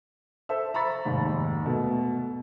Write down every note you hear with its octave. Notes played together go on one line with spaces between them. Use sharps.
A4 C5 E5 A5 E6
A#5 B5 C#6 A6 B6
F1 D#2 G#2
B2 A3 B3